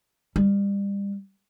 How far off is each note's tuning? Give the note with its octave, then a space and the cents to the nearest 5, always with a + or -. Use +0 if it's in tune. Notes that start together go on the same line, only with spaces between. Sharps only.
G3 +30